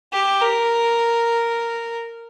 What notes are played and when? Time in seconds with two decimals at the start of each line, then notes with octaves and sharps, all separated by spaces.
0.12 G4
0.41 A#4